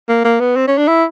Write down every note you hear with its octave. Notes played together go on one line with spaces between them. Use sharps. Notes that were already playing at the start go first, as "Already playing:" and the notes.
A#3
A#3
B3
C4
C#4
D4
E4